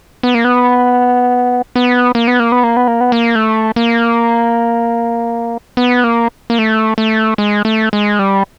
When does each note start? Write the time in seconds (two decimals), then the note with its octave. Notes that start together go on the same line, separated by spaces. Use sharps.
0.23 B3
0.35 A#3
0.44 B3
1.76 B3
2.15 A#3
2.27 B3
2.40 A#3
2.52 B3
2.63 A#3
2.77 B3
2.88 A#3
3.01 B3
3.12 A#3
3.35 A3
3.76 A#3
5.77 B3
6.04 A#3
6.50 A#3
6.59 A3
6.98 A3
7.38 G#3
7.65 A3
7.93 G#3
8.19 G3